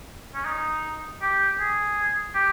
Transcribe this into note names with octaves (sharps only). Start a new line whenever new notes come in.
C#4
D#4
G4
G#4
G4